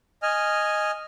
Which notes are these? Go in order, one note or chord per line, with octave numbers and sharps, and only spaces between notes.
D#5 G#5 F6